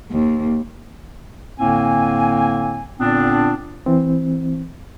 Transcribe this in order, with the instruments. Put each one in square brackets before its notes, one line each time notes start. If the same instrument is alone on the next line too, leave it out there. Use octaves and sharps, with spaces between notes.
[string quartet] D#2
[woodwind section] A2 D3 A#3 C4 G#5
A#2 D3 B3 C4 D4
[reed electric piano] E3 C4